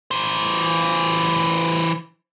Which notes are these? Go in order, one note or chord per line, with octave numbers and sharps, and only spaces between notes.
E3 C5